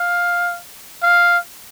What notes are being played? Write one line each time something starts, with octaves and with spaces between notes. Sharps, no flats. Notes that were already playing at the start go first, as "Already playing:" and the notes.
Already playing: F5
F5